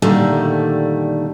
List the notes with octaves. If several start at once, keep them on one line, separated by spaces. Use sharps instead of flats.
A#2 D3 D#3 G3 A3